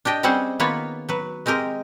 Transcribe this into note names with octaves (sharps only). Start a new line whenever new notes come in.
D4 G4 D#5 G5
G3 C4 C#4 G#4 C5 F#5
D#3 A#3 B3 F4 B4 C#5
F#3 B4
G#3 C4 G4 A#4 D#5